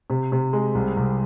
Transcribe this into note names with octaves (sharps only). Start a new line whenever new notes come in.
C3
C3
G#3
C2
C2